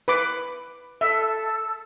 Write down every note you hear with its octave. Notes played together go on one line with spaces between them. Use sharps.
B4 B5 D6
A4 E5 E6